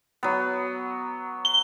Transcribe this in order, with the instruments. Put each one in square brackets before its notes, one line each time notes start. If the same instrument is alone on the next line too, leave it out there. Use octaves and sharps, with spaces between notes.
[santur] F#3 B3
[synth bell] G7